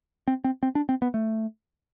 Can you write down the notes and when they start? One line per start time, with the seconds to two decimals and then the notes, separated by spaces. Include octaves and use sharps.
0.28 C4
0.44 C4
0.63 C4
0.75 D4
0.89 C4
1.02 B3
1.14 A3